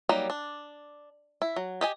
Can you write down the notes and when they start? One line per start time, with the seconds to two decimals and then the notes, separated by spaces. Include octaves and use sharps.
0.09 F#3 G3 A#3 D#4
0.30 D4
1.42 E4
1.56 F#3
1.81 G4 D#5 G#5